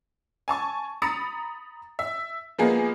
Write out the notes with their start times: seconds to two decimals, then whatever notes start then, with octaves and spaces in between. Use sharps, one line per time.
0.48 G#5 A5 C#6
1.02 A#5 B5 D#6 A6 C#7
1.99 E5
2.59 F3 G#3 A#3 B3 G#4